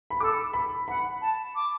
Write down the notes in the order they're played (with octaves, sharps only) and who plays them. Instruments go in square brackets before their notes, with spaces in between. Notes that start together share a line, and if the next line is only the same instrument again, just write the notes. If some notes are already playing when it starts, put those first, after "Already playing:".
[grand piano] B5
[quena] A4 [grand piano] D6
[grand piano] B5
[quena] F#5 [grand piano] B5
[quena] A5
D6